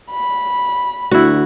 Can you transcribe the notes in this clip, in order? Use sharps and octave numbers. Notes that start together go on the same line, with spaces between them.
B5
D2 E4 F#4